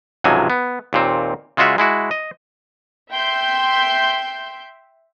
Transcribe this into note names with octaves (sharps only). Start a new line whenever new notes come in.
C#2 G#2 C3 F3 F#3 G#5
B3
D#2 A#2 C4
C#3 G#3 F4 F#4 E5
G#3 E4 F#4
D#5
E5 G5 C6 G6